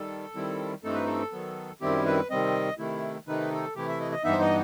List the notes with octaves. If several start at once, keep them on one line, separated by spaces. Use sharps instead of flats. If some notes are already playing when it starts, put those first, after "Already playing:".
Already playing: D#3 G3 A4
D#3 G3 C4 E4
G2 E3 A3 C4 D#4 A4
B4
A4
D#3 F#3 B3
F#2 D#3 G3 C4 E4 G4
B4
C3 D#3 G3 C4 D#5
C3 D#3 A3 E4
C3 D#3 A3 D#4 B4
A4
C3 E3 A3 E4 G4
E5
D#5
D#5
G2 E3 B3 D#4 E5
C5
D#5